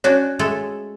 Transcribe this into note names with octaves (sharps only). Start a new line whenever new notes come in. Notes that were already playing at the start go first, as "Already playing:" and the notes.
C#4 D4 F#4 C#5
G#3 A3 A4